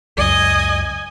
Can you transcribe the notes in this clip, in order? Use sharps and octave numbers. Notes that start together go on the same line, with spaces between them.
C#2 F#2 D#5 G#5